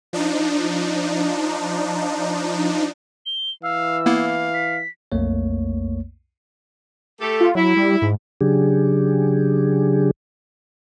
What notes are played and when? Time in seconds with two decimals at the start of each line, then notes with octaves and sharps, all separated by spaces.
0.13 F3 D4 D#4
3.26 G7
3.63 E3 F5 E6
4.06 A#3 B3 E4 F5
4.54 B6
5.12 B1 F2 A3 A#3 C#5
7.20 A3 G4 A4
7.40 F4
7.55 F#3 E4
7.76 G3
8.02 G#2
8.41 C#3 F#3 D4 G4 G#4